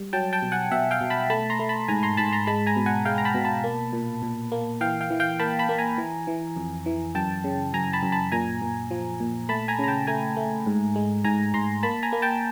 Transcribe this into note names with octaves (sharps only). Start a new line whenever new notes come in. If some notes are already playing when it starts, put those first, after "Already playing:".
Already playing: G3
F#3 G5 A5
G5 A5
B2
F#5 G#5
B2 E5 F#5
F5 G5
B2
A5 B5
A3 A5 B5
A#5 C6
A3
A5 B5
G#2 G#5 A#5
A#5 C6
G#2 A5 B5
A#5 C6
G#3 A5 B5
G#5 A#5
B2
F#5 G#5
G#3 F5 G5
A#5
A5 B5
B2
A5 B5
A#3
A#2
A#2
A#3
E3 F5 G5
F5 G5
E3
F5 G5
A#3 A5 B5
A5 B5
A#3
G#5 A#5
E3
E3
F2
E3
F#2 G5 A5
C#3
F#2 G#5 A#5
A5 B5
F#2
A5 B5
A#2 G#5 A#5
A#2
F3
A#2
A3 A5 B5
G#5 A#5
C#3 A#5
G5 A5
A3 G#5 A#5
A3
G#2
G#3
G#2 G#5 A#5
G#2 A#5 C6
A#3 A5 B5
G#5 A#5
A#3
G5 A5